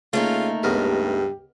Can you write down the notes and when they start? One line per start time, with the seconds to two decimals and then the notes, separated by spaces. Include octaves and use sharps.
0.13 C#3 A3 A#3 D#4 F4
0.63 C#2 G2 B3 G4 A#4